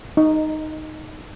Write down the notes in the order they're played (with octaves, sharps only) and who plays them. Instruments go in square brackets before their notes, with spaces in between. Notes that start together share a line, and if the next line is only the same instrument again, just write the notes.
[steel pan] D#4